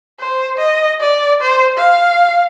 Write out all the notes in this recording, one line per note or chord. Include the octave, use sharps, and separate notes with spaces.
C5
D#5
D5
C5
F5